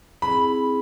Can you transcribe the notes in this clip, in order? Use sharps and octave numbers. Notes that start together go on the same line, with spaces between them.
C4 E4 G#4 B5